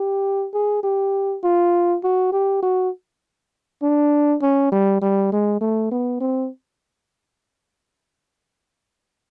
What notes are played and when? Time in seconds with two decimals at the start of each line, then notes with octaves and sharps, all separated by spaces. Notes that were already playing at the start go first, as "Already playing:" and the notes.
Already playing: G4
0.54 G#4
0.83 G4
1.44 F4
2.03 F#4
2.32 G4
2.62 F#4
3.82 D4
4.42 C#4
4.72 G3
5.02 G3
5.32 G#3
5.61 A3
5.92 B3
6.21 C4